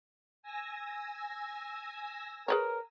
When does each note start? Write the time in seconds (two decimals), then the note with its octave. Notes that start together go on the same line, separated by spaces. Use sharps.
0.43 G#5 E6 A#6
2.48 G#4 A#4 B4 C#5